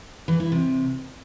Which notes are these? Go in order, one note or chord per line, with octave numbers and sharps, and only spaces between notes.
E3
E4
C3